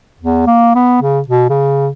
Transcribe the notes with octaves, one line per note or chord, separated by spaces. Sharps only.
E2
A#3
B3
C#3
B2
C#3